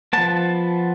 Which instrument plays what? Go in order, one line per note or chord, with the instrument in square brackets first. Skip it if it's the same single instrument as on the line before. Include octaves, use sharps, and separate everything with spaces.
[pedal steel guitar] F3 B3 A5